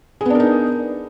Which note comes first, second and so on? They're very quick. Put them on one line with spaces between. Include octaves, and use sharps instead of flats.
G#4 B3 D4 A#4 D#4